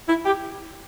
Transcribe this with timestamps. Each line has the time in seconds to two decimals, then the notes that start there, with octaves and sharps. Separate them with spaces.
0.09 E4
0.26 G4